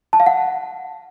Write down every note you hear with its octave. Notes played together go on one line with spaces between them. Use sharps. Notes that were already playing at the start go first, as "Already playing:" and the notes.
A5
F5
F#5